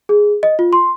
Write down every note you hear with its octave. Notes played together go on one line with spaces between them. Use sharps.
G#4
D#5
F4
C6